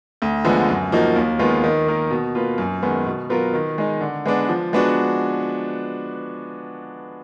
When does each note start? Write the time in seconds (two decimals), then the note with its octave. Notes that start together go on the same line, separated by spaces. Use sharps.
0.22 D2
0.44 D3 F3 G#3 B3
0.69 F#2
0.92 F3 A#3 D#4 F#4
1.16 D#2
1.39 D#3 G#3 B3 F4
1.64 D#3
1.87 A#3 D#4 A#4
2.11 B2
2.35 A#3 F4 B4
2.58 F#2
2.83 D#3 G#3 B3
3.06 B2
3.30 F#3 B3 F4 A#4
3.54 D#3
3.78 G#3 D#4
4.01 D3
4.26 G#3 B3 D4
4.49 F3
4.73 G#3 B3 D4 F#4